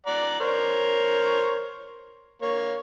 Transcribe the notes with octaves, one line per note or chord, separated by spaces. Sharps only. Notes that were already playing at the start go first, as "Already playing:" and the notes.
D5 F#5 A#5
A#4 C5 C#5
A#3 C#5 C#6